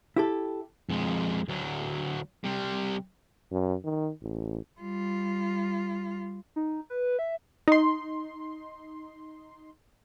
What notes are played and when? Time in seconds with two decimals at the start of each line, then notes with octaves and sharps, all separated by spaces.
0.16 E4 G4 A4
0.89 F2 G#3
1.49 D2 F#3
2.44 C3 G3
3.51 F#2
3.84 D#3
4.22 A1
4.81 G3 F4
6.56 D#4
6.90 B4
7.19 E5
7.68 D#4 C6